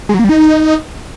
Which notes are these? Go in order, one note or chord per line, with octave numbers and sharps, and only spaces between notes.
G#3
F#3
A#3
G3
D#4